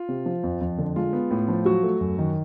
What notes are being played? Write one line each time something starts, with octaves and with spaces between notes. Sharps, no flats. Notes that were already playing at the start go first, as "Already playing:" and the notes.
Already playing: F4
C3
F3
F2
F2
D3
G#3 F4
B3
A2
F3
F#3 F#4
A3
F#2
D#3